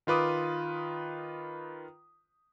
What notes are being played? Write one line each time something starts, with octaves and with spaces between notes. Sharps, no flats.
D#3 F4 B4 D6 D#6